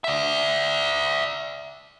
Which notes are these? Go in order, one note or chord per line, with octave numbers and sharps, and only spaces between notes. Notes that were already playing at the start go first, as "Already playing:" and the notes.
D5 E5